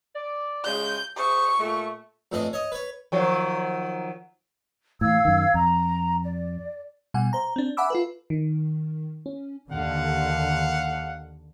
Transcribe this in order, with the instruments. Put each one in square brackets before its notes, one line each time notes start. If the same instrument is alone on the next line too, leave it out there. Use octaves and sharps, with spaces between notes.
[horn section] D5
[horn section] C#3 G#3 [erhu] G6
[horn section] G#4 C5 E5 [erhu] C#6
[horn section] A#2 A3
[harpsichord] F2 A2 E3 D4 D#5
C#5 D#5
B4 C#5
[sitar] D#3 F3 F#3
[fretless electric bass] A2 E3 [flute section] F5 E6 G#6
[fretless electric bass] F#2 D#3
[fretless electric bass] F2 [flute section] A#5
[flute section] D5
[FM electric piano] B2 G3 F#5 G#5
C5 A#5
C4 D4
E5 F#5 G#5 B5 D6 E6
F4 A4 B4
D#3
C#4
[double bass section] D#2 D3 [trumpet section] F5 F#5